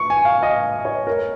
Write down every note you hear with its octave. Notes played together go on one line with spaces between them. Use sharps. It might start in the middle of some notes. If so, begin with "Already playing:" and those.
Already playing: C#6
G#5
F5
D#5
C#5
A#4